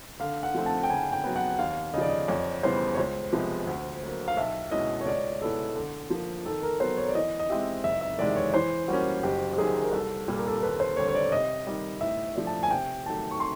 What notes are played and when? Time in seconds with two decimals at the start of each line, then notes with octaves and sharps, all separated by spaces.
0.20 D3 F5
0.43 F#5
0.54 F3 A3 C4
0.66 A5
0.83 G5
0.89 C#3 G#5
1.12 G5
1.24 F#3 B3
1.36 F#5
1.59 D#2 F5
1.93 C#3 D#5
1.97 F3 D5
2.09 D#5
2.28 F2 C#5
2.63 C#3 E3 G3 B3 C5
2.94 C#5
2.98 C#2 C5
3.32 C3 F3 G#3 B3
3.67 D2
4.02 D3 F#3 A#3
4.28 F5
4.37 B1 E5
4.71 B2 G#3 C#4 E4 D#5
5.00 C#5
5.06 C#2 D5
5.41 B2 G#3 B3 E4 A4
5.76 D3
6.10 F3 A#3
6.46 D#3 A4
6.63 A#4
6.80 F#3 B3 D#4 C5
6.97 C#5
7.08 D5
7.15 E3 D#5
7.40 D#5
7.49 G#3 C4 E4 G4 E5
7.84 F#1 E5
8.01 E5
8.19 E2 C3 D#3 G#3 D5
8.36 C#5
8.54 E3 C5
8.88 G3 A#3 C#4 F#4
9.23 F#1 G4
9.53 G4
9.58 F#2 D#3 F#3 G#4
9.84 A#4
9.93 C2 A4
10.28 A#2 G3 A4
10.38 A#4
10.48 A4
10.63 D#2 B4
10.80 C5
10.96 D3 G3 C#5
11.09 C#5
11.15 D5
11.32 C3 D#5
11.67 D#3 G3
12.01 A2 E5
12.36 F3 A3 D4
12.47 A5
12.63 G#5
12.71 C3 G5
13.06 D#3 F#3 A3 A5
13.31 C#6
13.40 C6